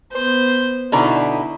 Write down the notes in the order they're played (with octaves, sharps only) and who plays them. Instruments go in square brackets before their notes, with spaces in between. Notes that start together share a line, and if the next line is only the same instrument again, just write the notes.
[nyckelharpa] B3 C5
[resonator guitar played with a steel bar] B2 D3 A#5 [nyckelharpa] D#4 E4